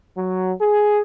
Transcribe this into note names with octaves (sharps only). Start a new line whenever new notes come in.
F#3
G#4